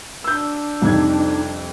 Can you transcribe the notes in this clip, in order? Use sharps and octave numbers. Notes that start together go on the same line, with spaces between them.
D4 E6 G6
C2 F2 D#4 G#6